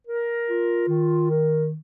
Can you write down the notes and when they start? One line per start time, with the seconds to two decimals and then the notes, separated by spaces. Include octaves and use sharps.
0.07 A#4
0.49 F4
0.89 D#3
1.30 A#4